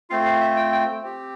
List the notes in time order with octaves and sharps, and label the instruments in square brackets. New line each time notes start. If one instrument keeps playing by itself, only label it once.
[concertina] A3 C4 F4 F5
F5
E5
G5
G5
C4 G4